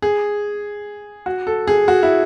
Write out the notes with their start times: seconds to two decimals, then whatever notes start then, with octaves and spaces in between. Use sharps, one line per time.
0.02 G#4
1.26 F#4
1.47 A4
1.68 G#4
1.88 F#4
2.03 E4